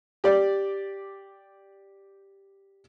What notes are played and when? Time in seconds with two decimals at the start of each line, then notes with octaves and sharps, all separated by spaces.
0.24 G4 D5